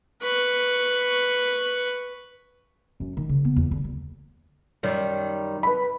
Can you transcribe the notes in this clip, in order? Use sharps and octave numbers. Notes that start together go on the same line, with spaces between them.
B4 C#6
F#2
D#3
C#3
B3
E2
D3
D2
F#2 D#3 G3
B4 B5